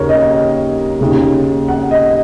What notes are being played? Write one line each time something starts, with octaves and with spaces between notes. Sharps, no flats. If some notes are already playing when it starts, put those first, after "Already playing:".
Already playing: D#2 C#3 A#4 C#5
D#5
D#2 C#3
F#5
D#5